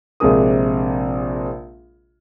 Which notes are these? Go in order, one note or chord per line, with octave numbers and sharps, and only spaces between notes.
A#1 C3 G#3 G#4 A#4 D#6